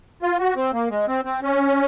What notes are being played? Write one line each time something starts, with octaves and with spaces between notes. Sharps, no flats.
F4
F#4
C4
A#3
G#3
C4
C4
C#4